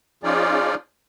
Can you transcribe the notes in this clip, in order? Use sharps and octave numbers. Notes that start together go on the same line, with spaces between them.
F3 C#4 D#4 F4 G#4 D5